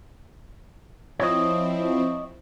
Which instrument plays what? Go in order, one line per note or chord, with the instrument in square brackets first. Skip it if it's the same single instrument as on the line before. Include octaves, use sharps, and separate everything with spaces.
[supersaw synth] F3 C4 E4 [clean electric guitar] C#5 D#5